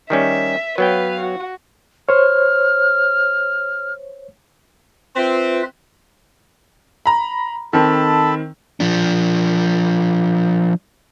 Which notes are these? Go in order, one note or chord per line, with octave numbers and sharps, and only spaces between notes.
D#3 G3 C#4 E5
F#3 B3 B4 F5 G5
F#4
C5 C#5 F6
C4 F4 B4 E5
A#5 B5
D#3 C4 A4 A5 B5
F3 D4